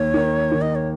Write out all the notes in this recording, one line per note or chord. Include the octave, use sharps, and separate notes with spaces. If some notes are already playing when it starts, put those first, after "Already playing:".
Already playing: D#2 D#3 C#5
D#3
D#3
D#5
C#5